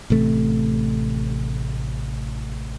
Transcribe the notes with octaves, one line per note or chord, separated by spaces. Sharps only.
A1 C3 A3